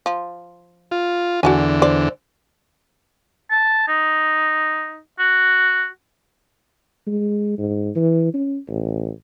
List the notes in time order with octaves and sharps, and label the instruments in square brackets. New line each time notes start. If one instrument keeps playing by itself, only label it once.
[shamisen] F3
[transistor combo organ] F4
[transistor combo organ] E2 D3 [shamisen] F#4 A4 G#5
[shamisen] C5 D5
[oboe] A5
D#4
F#4
[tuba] G#3
G#2
E3
C#4
A1